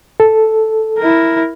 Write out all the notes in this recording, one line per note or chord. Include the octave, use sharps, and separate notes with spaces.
A4
E4 A#4